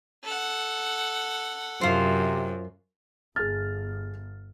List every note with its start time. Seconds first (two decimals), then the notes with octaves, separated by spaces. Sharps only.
0.24 A4 F#5
1.81 F#2 C3 F4 C5
3.36 G1 G#4 F6 A6